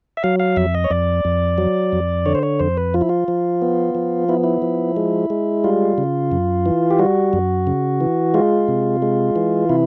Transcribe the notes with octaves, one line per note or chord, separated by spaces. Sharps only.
E5
F#3 F5
F5
F2 E5
D#5
C#5
F2 D5
F2
F#3
F2
D3 C#5
C5
C#5
F2 C5
B4
F3 F4
E4
F4
F3
B3
F3
B3 E4
E4
F3
G#3
G#3
G3 F4
C#3
F#2
E3
G4
G3 F#4
F#2
C#3
E3
G#3 F4
C3
G#3
E3
C3 E4